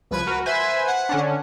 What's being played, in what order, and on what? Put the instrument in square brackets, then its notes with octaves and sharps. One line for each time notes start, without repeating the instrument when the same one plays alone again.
[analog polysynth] C#2 F3 G#6 [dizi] B4
[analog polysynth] F#4 A#4
[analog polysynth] B4 C5 G#5 [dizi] E5
[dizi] F#5
[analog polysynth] D3 C#4 D4